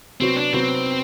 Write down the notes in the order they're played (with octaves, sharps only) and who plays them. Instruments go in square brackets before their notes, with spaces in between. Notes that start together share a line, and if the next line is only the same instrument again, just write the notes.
[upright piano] C3 F#3 B3 F#4 [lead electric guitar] C4
[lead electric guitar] D4
[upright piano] C3 F#3 B3 F#4 [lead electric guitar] C4